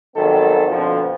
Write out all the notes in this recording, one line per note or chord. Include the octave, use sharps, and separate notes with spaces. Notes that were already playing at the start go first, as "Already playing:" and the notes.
G#1 D#3 F#3 G3 B3 A4
F2 B2 D3 F3